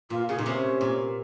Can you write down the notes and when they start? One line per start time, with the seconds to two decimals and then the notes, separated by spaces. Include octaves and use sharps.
0.10 A#2 F4
0.29 C#3 G#4
0.38 A#2 D#4
0.46 C3 C#4
0.81 A#2